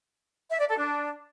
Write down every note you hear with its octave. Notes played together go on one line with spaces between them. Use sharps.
E5
D5
A4
D4